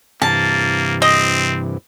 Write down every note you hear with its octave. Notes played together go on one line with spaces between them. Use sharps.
G2 C3 E3 A#3 A5
C4 D#5